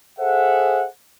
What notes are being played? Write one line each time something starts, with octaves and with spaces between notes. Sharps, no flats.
G#4 A4 C5 E5 F#5